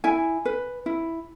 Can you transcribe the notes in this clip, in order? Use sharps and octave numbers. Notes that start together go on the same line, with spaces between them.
E4 G#5
B4
E4